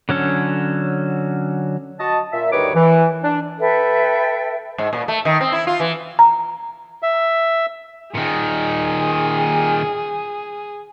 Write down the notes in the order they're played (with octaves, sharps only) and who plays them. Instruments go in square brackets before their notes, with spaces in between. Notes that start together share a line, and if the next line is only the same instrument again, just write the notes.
[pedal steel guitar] D3 F#3 C#4 A4
[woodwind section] F#4 D#5 A5
A#2 E5
D2 G2 D#3 B4 C#5 D6
E3
D4
[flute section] A4 B4 E5 G5
[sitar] G#2
A#2
A3
D#3
C4
E4
F4
E3
[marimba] A#5
[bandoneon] E5
[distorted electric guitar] A#2 D#3 [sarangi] G#4